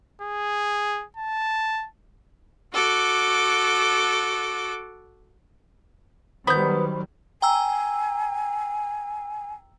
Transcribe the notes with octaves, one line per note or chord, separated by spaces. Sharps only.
G#4
A5
F#4 A4 D6
D#3 F#3 G3 B3 C5 B5 G6
G5 G#5 A#5 E6